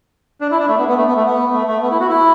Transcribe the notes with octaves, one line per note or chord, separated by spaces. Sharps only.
D4
E4
D4
A3
B3
B3
A3
B3
A3
B3
A3
A3
B3
E4
F#4
E4